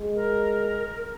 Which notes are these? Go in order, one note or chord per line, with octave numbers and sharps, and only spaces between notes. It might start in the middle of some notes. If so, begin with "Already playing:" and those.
Already playing: G#3
A#4